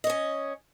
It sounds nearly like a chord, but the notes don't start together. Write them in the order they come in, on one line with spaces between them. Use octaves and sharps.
D#5 C#5 C#4